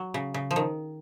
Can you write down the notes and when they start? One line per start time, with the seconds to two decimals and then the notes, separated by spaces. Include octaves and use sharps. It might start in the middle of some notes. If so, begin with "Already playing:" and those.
Already playing: F#3
0.14 C#3
0.34 C#3
0.51 F3
0.56 D#3